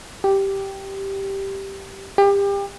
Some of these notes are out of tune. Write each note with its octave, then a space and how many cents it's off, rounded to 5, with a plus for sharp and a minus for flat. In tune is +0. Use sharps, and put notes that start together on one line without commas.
G4 -5
G4 +30